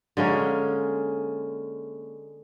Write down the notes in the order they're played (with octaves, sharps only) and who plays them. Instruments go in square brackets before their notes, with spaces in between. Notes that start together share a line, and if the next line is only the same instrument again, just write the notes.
[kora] D3 G#3 A#3 C#4